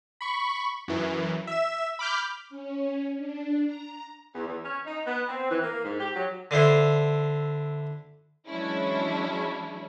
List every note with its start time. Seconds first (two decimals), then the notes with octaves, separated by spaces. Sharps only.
0.21 B5 C#6
0.88 F#2 E3
1.47 E5 E7
1.99 B5 D6 F6 G6
2.49 C#4
3.17 D4
3.65 A#5
4.35 E2
4.48 E2
4.64 C#4
4.86 D#4
5.06 B3
5.28 C4
5.51 E3
5.63 A#3
5.84 G#2
6.00 G4
6.15 F#3
6.51 D3 D4 E4 C5
8.48 E3 F#3 G#3 C#4 D4 E4